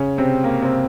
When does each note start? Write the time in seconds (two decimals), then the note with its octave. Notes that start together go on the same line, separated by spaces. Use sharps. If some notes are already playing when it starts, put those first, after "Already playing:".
Already playing: C#3 C#4
0.18 C3 C4
0.44 A#3
0.62 C3 C4